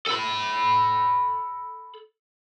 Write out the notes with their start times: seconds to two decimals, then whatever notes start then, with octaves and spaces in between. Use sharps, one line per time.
0.07 A4 B5